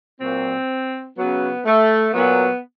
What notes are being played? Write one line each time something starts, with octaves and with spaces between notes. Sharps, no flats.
A#2 F#3 C4
C#3 F#3 B3
A3
A#2 F#3 B3